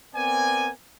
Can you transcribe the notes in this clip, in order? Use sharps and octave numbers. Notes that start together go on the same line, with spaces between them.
B3 C4 A#4 D5 G#5